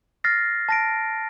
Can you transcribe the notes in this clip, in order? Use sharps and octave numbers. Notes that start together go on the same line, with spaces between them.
F6 A6 A#6 C7
A5 A#6 D7